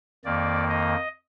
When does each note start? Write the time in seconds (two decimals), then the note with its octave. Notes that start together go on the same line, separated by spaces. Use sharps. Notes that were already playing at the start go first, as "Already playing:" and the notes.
0.25 F2 D#3 A#3 D5
0.69 D#5